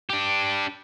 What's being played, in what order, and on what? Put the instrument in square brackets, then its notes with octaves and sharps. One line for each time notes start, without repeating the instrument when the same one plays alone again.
[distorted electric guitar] D4 G4